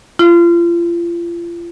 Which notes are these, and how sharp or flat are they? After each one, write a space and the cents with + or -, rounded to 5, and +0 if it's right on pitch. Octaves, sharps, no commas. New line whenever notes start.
F4 -35